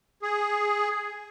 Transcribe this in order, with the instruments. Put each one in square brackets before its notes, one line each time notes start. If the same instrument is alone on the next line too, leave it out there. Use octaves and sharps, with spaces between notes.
[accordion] G#4